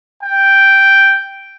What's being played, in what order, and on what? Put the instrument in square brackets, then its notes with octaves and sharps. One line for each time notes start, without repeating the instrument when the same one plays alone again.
[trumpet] G5